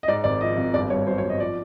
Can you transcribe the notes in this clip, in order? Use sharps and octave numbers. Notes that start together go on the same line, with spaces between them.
D#5
G#2 D5
G#1 D5
F3 D#5
G#1
G1 D5
G2 C#5
F#3 C5
C#5
G1
D#5
F3 D5